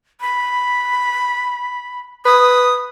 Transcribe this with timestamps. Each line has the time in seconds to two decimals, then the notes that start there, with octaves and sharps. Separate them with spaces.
0.21 B5
2.25 B4 D#6